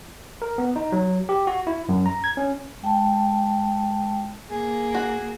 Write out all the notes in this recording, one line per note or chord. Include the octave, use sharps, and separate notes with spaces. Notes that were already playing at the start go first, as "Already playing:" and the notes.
A#4
B3
D#4
F#3
G4
F#4
E4
F#2
A#5
G#6
C#4
G#3 G5 A5
A#3 G#4
F#4